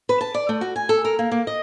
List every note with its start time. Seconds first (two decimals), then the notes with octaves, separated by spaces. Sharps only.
0.09 B4
0.21 A5
0.34 D5
0.49 A3
0.61 F#4
0.76 G#5
0.89 A4
1.05 A#4
1.19 A#3
1.31 A#3
1.47 D#5